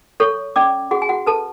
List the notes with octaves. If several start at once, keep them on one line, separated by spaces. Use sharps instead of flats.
A4 C#5 C#6
C#4 D5 D6
F#4 G#4 F#5
G#5
F#4 F#5
A4 B4 A5